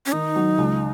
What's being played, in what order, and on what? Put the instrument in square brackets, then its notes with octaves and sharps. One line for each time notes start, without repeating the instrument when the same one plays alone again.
[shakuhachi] C#4
[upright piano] D#3 [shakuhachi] D#4
[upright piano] F#3
C#2